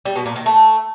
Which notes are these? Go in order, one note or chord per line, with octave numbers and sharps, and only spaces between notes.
G3
B2
A#2
D#3
A3